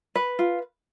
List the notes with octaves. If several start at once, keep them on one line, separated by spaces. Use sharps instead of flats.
B4
F4